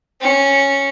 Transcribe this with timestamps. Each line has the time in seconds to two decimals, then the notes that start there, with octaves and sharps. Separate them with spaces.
0.21 C#4 C#7